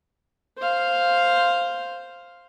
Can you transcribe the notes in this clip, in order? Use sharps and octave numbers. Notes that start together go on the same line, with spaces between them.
C5 F5